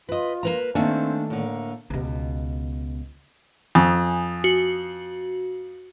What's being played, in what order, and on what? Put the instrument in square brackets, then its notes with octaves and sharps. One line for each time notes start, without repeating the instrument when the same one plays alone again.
[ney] F4 [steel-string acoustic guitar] B4 D#5
[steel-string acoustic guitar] A#3 B4 A#5
[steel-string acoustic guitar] D#3 A3 [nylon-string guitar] A#3 D4 G#5 [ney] C4
[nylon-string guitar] A2 D3 [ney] A#3
[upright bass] C#2 B2
[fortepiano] F2 [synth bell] G#5 D#6
[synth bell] F#4